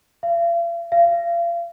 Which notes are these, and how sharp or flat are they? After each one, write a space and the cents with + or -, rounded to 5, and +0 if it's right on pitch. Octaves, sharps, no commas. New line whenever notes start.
F5 -45
F5 -35